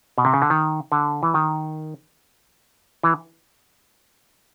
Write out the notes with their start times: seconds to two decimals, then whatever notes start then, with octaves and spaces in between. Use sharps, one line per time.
0.18 B2
0.25 C3
0.34 C#3
0.42 D3
0.50 D#3
0.92 D3
1.23 E3
1.34 D#3
3.03 E3